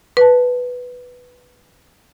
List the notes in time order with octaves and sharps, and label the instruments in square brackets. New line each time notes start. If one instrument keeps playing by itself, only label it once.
[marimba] B4 A5